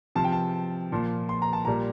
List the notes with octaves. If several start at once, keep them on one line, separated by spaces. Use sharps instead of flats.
C3 F3 A5
G5
A5
A#2 F3
C6
A#5
A5
A#2 G3 A#5